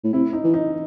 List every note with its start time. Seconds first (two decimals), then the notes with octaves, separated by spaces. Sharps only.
0.04 A2
0.13 C3 E4
0.33 D#4
0.44 E3
0.54 D#4